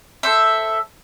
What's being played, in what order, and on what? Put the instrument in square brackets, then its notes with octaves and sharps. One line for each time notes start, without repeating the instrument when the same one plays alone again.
[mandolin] A4 C5 E5